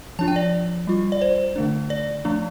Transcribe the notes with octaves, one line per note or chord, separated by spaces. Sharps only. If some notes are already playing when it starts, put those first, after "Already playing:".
F3 D4 F4 A5
G5
D5
G3 F4
D5
C5
D3 A3 D4
D5
F3 A3 D4